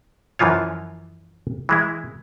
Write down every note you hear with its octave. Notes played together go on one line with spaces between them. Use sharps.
F#2 E3 F3 F4 C#5
E3 G#3 E4